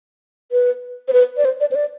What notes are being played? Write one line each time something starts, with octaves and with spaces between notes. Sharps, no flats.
B4
C5
B4
D5
C5
D5
C5
D5